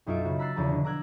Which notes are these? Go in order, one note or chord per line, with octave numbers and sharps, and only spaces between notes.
B1 F#2 D#4 F4 E5 D7
C#3 F4 F#4
A#5 B5 E6 F#6 A6 C7
E2 C#3 F3 B4 A#5
B2 D3
A#5 D6 E6 F#6 G#6